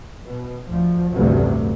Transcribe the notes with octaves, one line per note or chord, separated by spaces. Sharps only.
B2
D2 F3
A1 D2 G2 C3 F#3